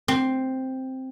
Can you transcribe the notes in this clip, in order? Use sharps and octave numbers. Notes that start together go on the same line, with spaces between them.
C4